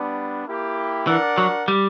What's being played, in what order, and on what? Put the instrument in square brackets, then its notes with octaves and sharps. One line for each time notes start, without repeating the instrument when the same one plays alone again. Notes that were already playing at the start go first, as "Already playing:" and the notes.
Already playing: [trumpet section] G3 B3 D4
A#3 E4 G4
[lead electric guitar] E3 [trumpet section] D4 A#4 D5 F#5
[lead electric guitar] F#3
G3